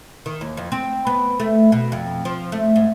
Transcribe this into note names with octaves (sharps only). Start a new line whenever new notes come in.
D#3
D#2
F2
C4
B3
A3
B2
F2
F3
A3
G#2